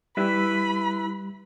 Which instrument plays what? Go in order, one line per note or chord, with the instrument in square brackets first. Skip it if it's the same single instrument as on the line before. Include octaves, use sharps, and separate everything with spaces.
[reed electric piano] G3 [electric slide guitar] E4 B4 E5 [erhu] B5